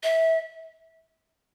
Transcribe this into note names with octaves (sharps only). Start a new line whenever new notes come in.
E5